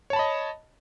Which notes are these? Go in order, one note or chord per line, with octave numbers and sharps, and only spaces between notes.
C#5 D#5 A5 B5